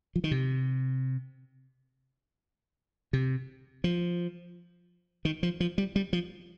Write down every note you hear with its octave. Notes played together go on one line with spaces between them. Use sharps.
F3
D#3
C3
C3
F3
D#3
F3
F3
G3
G3
F3